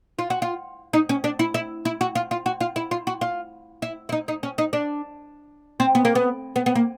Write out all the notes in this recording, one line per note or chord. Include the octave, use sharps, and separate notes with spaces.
F4
F#4
F4
D#4
C#4
D4
E4
E4
E4
F#4
F4
F4
F#4
F4
E4
F4
F#4
F4
E4
E4
D#4
D#4
C#4
D#4
D4
C4
B3
A#3
B3
B3
B3
A#3